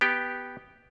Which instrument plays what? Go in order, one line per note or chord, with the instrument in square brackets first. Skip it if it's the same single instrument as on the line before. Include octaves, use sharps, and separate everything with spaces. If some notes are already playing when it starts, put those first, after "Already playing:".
[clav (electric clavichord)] B3 G4 G5